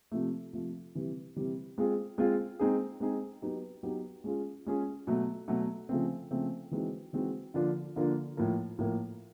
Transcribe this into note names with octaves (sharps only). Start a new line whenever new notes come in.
C3 F3 A3
C3 F3 A3
C3 E3 G3
C3 E3 G3
G#3 C4 F4 G#4
G#3 C4 F4 G#4
G#3 C4 D#4 G#4
G#3 C4 D#4 G#4
F#3 B3 D#4 G4 B4
F#3 B3 D#4 G4 B4
G#3 C#4 F4 G#4
G#3 C#4 F4 G#4
B2 F#3 A3
B2 F#3 A3
C#3 F3 A3 C4
C#3 F3 A3 C4
E3 G#3 C4 D#4 F#4
E3 G#3 C4 D#4 F#4
D3 F3 A#3 D4 F4
D3 F3 A#3 D4 F4
A2 F3 A#3
A2 F3 A#3